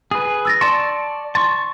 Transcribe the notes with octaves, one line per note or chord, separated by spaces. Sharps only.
G#4 B4
E6 A6 A#6
D5 A5 C6 C#6
A5 C6 C#6